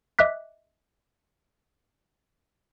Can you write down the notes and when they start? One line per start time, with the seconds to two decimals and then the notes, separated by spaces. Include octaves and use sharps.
0.19 D#5 E5 D6 F#6 B6